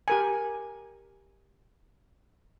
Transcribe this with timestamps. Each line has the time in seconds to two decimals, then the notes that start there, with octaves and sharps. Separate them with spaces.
0.08 G4 A#4 G#5